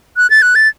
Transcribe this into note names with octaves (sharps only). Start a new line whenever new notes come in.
F#6
A6
F#6
A6